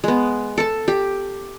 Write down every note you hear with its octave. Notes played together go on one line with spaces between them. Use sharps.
G#3 B3
A4 A5
G4